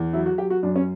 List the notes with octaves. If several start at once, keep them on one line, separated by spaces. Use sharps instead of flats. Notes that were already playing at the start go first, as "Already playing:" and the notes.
Already playing: E2
F#3 E4
F#4
F#3 G4
F#4
F#2 D4
C#4